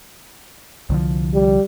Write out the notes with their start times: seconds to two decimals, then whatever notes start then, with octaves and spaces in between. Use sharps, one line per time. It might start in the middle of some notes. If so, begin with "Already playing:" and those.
0.90 C2 D3 F3
1.34 G3